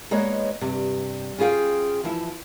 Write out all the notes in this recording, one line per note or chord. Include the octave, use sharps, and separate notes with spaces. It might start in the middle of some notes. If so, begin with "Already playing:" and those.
G#3 A#3 B3 D#4 C#5 D#5
G2 C3
C#4 F4 G#4 F5 G5
E3 F3 E4